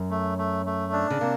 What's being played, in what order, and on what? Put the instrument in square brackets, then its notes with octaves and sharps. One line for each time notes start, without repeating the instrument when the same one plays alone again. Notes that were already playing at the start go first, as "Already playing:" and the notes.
Already playing: [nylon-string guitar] F#2
[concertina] A3
A3
A3
D4
[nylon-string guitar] C#3
[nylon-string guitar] C3 [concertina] A#3